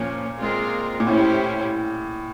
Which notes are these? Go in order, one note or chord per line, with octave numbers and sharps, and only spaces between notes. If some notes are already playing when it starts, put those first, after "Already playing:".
Already playing: A#2 F3 A#3 C#4
G#3 C4 F4 A#4
A#2
A2 C#4 E4 G4 C5